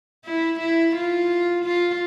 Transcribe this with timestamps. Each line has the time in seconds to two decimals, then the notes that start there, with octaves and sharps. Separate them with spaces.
0.25 E4
0.60 E4
0.95 F4
1.65 F4